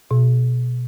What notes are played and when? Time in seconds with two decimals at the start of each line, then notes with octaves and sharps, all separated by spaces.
0.11 B2